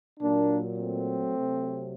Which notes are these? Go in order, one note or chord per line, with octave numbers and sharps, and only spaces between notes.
A#2 F#3 A#3 D4
A3 C4
C3 F#3